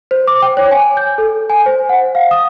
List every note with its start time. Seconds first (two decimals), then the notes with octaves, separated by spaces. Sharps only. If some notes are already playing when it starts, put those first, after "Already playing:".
0.11 C5
0.27 D6
0.42 G5
0.57 C#5
0.71 G#5
0.97 G6
1.18 A4
1.50 G#5
1.66 C5
1.89 F#5
2.15 F5
2.31 D#6